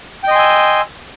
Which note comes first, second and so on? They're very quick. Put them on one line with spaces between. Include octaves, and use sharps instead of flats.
G5 D#5 C6 G#5 E6